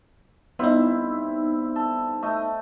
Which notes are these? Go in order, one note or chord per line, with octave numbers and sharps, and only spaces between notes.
G2 B3 C4 D#4 E4
A4
A3 D#5